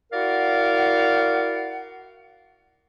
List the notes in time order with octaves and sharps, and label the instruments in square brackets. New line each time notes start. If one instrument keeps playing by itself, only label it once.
[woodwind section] E4 F#4 A#4 D5 F5 F#5